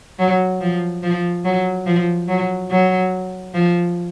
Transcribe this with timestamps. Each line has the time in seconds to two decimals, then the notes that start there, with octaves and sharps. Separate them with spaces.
0.19 F#3
0.61 F3
1.03 F3
1.45 F#3
1.86 F3
2.28 F#3
2.70 F#3
3.54 F3